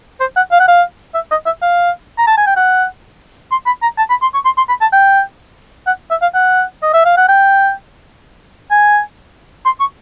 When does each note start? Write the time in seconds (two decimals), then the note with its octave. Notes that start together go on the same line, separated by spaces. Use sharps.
0.20 C5
0.36 F#5
0.52 F5
0.60 F#5
0.68 F5
1.15 E5
1.31 D#5
1.46 E5
1.62 F5
2.18 A#5
2.27 A5
2.38 G#5
2.47 G5
2.56 F#5
3.51 C6
3.66 B5
3.82 A#5
3.98 A5
4.10 B5
4.22 C6
4.34 C#6
4.45 C6
4.58 C6
4.69 B5
4.81 A5
4.92 G5
5.87 F#5
6.11 E5
6.22 F5
6.34 F#5
6.83 D#5
6.94 E5
7.05 F5
7.17 F#5
7.29 G5
8.71 G#5
9.65 C6
9.80 C#6